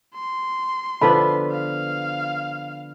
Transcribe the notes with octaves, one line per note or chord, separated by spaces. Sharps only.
C6
D3 F3 B3 B4 A5 B5
F5